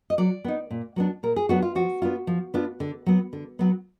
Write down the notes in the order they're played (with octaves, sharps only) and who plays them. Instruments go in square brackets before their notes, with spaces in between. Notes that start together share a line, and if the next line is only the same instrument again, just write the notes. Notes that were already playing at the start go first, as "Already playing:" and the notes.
[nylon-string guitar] D#5
F#3 D5
B3 D#4
A#2
F#3 B3 D4
A#2 A#4
G#4
F#3 B3 D4 F#4
F4
F3 F#4
B3 D4 F4
F3
B3 D4 F4
D3
F#3 B3
D3
F#3 B3